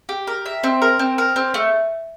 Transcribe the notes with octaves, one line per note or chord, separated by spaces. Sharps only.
G4
A#4
E5
C4
A#4
C4
A#4
C4
A3